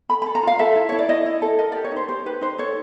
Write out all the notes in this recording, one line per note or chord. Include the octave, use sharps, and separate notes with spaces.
A4 B5
B5
A4
A#5
F4 F5
A4 E5
E4
E4 C#5
D5
E4 D#5
E4
A4
A#4 D#5
D5
G4
C#5
D#4 C5
G4 C5
G4 B4
D#4 C5
A4 C#5